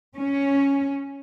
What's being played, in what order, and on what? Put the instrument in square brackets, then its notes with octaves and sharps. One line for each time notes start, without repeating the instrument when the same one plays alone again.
[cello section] C#4